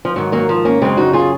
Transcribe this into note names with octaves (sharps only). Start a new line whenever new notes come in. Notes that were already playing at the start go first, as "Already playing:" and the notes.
F3
G#2 D#3 F#3
F#3 A#3
F3
A#3 C#4
F#2 C#3 G#3 C4
D#4 F#4
F4 G#4